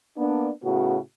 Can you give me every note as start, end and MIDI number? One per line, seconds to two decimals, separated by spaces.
0.17 0.49 58
0.17 0.49 59
0.17 0.49 62
0.63 0.97 45
0.63 0.97 49
0.63 0.97 59
0.63 0.97 66